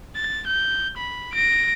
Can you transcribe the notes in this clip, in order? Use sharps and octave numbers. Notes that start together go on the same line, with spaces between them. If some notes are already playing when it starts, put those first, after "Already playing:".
A6
G6
B5
A#6 D7